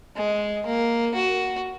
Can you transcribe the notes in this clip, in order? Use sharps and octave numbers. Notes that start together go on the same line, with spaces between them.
G#3
A#3
F#4